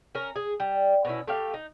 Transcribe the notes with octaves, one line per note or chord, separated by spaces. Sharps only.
C#4 A#4
G#4
G3
B2 C#4 E4
A3 G4 F5
D#4